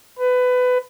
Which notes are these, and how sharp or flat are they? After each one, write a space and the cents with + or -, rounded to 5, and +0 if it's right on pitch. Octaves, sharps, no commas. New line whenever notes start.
B4 +20